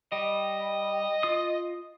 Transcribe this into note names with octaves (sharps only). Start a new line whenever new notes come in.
G3 D#5
F4 D#6